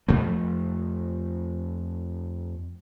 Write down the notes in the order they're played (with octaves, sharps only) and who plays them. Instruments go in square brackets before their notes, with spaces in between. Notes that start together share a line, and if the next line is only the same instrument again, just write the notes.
[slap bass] F2 A3